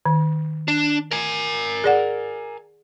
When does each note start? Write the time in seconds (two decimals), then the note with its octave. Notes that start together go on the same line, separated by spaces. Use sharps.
0.06 D#3
0.68 D4
1.11 A#4 G#5
1.84 G#4 D5 F#5